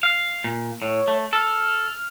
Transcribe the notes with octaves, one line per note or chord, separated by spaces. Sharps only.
F5
A#2
A2 C#5
A3
A4 F6